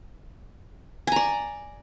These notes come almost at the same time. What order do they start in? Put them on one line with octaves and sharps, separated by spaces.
G#5 A#5 D5